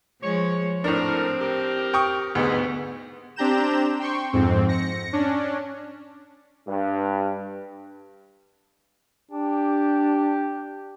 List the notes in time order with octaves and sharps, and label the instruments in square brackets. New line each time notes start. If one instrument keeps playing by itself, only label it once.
[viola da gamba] F3 G#3 [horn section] C#5
[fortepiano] A2 D4 [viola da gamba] C4 [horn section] A#4
[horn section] G4 A#4
[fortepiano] G5 C#6 D#6
[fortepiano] D2 [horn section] G#2 [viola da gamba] B3
[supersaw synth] C4 D4 G4 A#5 G6 E7
G5 C6 C#6
F2 G#2 C4
A#6 C#7
C#4 D4
[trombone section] G2
[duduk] D4 [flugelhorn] G4